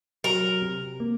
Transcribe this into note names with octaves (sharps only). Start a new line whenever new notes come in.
F#3 A#4
C3
A#3